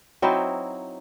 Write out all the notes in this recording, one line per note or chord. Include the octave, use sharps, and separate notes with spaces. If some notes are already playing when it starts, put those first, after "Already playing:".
F#3 C4 D#4 E4